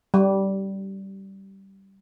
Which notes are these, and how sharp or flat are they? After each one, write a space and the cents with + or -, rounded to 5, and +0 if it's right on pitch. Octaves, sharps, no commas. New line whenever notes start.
G3 -15